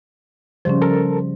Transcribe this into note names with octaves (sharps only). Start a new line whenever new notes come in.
C#3 F3 G3 C#4 C5
A4 A#4 A5